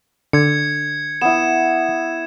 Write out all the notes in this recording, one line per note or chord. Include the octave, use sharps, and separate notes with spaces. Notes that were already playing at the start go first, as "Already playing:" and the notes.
D3 G#6 C#7
B3 E4 E7